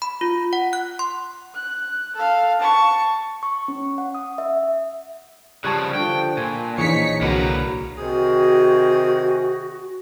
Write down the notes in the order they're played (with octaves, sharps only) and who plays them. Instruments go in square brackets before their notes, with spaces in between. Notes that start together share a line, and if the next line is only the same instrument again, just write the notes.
[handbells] B5
F4
F#5
F#6
C6
[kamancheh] F#6
A4 F5
A5 C#6
[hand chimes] C#6
C#4
F#5
D#6
E5
[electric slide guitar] C#3 F3 [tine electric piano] G3 G#6 [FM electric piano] A5 C#6 F#6
[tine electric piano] D3 F3 [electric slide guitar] G5
[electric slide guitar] A#2 [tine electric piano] G#5
[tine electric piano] A#1 G#4 C#5 [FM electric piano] E3 [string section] D#4 B6 C#7
[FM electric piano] C2 F#4 [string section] D3 A#5 [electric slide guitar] A#3 B4
[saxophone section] C3 D#3 G#4 [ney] F#4